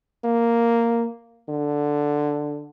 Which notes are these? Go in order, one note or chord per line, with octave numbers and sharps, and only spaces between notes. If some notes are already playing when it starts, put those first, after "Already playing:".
A#3
D3